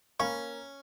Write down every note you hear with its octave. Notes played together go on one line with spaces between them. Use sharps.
A#3 C#4 F5 G#5 B5 C#6